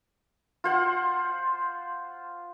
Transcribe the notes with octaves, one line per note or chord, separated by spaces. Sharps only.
F4 C5 F#5